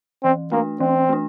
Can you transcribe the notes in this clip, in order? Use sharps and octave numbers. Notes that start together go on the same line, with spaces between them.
E3 C4
A3 A#3 D4
E3 C4
A3 D4